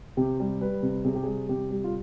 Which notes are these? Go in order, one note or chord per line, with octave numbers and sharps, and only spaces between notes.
C3 G4
G3
G3 B4
C3
C3 G#4
G4
G3 G#4
C3 G4
G3
F4